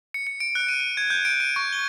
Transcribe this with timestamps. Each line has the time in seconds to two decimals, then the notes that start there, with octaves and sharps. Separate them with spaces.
0.14 C#7
0.27 C#7
0.40 D7
0.55 F#6
0.68 D#7
0.80 D#7
0.97 G#6
1.10 G6
1.25 D7
1.40 D#7
1.56 C#6
1.73 G7